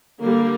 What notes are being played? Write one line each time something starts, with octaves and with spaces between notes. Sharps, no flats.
D3 G3 A#3